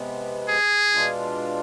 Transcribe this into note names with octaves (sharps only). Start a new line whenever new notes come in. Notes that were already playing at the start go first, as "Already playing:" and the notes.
Already playing: C3 G#3 B3
G#4
B2 G#3 D4 F4